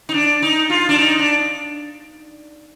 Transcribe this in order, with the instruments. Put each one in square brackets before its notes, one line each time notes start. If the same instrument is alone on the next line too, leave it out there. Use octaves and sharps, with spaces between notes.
[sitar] D#4
D4
D#4
F4
D4
D#4
D4